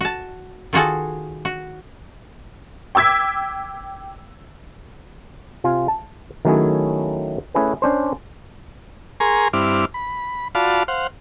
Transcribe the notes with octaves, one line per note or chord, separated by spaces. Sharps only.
F#4 A5
D#3 F4 F#4 G#4 A4
F#4
G5 D6 E6 G#6 B6
C3 F4 G#5
A5
D#3 F#3 A3 C#4 E4 G#4
A3 C#4 E4 G#4 B4
C#4 D4 C5
G#4 A#4 G#5 A#5 C6 C#6
G2 C4 E4 D6 F6
B5
F4 F#4 D5 F5 A5 B5
C5 F5 F#5